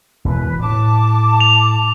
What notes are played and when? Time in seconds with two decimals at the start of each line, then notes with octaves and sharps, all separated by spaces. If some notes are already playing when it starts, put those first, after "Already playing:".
0.25 E1 B2 E3 B4
0.59 A2 A5 D6
1.40 F7